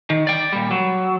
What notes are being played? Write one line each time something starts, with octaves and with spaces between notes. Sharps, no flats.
D#3
D5 G5
A#2 G3
F#3